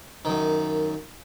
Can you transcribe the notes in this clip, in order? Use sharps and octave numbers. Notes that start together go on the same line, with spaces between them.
F#2 D#3